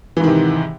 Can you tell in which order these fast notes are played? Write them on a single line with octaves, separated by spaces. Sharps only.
E3 G#2 D#3 C3